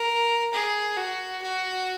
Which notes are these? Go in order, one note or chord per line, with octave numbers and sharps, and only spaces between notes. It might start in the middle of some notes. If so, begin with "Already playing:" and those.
Already playing: A#4
G#4
F#4
F#4